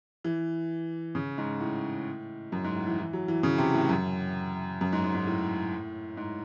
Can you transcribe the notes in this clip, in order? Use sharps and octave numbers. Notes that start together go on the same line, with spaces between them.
E3
C#3
G#2
A2
F#2
G#2
A2
E3
E3
F#3
E3
C#3
C3
A2
F#2
F#2
G#2
G#2
G#2
A2
G#2